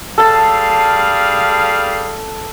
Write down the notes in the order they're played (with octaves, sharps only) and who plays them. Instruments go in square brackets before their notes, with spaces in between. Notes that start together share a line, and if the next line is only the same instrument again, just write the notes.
[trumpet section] G3 G#4 F5 [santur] A4 A5